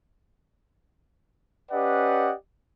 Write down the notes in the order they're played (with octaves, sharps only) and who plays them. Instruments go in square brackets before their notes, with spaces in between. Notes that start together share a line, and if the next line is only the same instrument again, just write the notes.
[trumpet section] C#4 G4 B4 D5 D#5 F#5